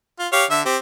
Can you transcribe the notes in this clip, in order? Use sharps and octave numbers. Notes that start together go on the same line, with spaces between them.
F4
G4 C#5 F5
D3 E5
C4 G4